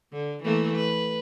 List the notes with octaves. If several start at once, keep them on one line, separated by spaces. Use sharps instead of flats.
D3
E3 A3 A#3
B4